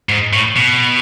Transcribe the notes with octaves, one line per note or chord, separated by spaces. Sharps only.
G#2
A2
B2